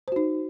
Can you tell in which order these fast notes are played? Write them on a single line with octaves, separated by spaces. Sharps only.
C5 F#4 D#4